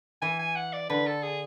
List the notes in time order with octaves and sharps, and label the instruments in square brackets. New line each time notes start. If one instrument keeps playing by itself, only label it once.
[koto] E3 [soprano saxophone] G#5
[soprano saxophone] G#5
F#5
D5
[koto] D3 [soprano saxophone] B4
[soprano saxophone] A4
G#4